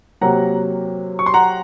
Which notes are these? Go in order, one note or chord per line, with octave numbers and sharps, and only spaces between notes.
C3 F#3 A#3 F#5 A#5
C#6
C6
F#5 A#5